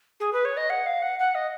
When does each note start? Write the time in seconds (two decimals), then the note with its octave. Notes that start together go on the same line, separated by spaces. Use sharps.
0.20 G#4
0.33 B4
0.45 C#5
0.57 D#5
0.70 F#5
0.86 F5
1.02 F#5
1.19 F#5
1.35 D#5